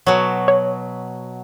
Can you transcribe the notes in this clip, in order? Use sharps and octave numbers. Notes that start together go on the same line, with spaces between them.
B2 F#3
C#5